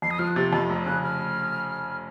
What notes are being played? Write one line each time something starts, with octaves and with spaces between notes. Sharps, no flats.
F2 C7
D#6
F3 F6
F#6
C3 A6
F2 A6
F1
C#3 F#6
F6